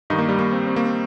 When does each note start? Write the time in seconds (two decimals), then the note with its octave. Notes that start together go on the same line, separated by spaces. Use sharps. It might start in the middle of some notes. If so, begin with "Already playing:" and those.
0.10 G2 D#3 D#4
0.18 A#3
0.29 G3
0.39 A#3
0.53 C4
0.67 C4
0.76 A#3
0.86 C4